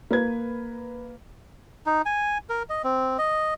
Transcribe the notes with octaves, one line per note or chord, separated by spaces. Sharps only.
A#3 B4 G#6
D#4
G#5
A#4
D#5
C4
D#5